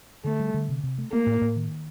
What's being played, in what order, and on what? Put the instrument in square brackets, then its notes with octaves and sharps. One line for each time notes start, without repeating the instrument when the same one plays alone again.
[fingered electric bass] D3 [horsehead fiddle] A3
[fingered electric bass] G3
D3
C3
C3
A3
[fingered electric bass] A3 [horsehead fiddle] A#3
[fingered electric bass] A2
A2
D#3